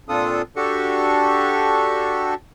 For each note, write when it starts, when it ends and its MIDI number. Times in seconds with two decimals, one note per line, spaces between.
0.09 0.42 46
0.09 0.42 60
0.09 0.42 62
0.09 0.42 65
0.09 0.42 69
0.09 0.42 87
0.56 2.34 62
0.56 2.34 66
0.56 2.34 67
0.56 2.34 69
0.56 2.34 85